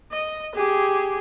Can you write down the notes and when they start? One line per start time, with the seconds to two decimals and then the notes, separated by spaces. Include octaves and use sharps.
0.12 D#5
0.55 G4 G#4